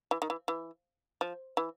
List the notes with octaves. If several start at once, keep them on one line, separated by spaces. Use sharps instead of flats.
E3
D#3
E3
E3
F3
E3